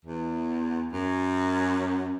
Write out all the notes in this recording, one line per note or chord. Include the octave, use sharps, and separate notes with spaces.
E2
F#2